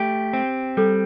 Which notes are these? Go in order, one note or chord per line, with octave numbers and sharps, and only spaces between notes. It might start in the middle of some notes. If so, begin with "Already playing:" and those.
Already playing: A3 G4
C4
G3 A4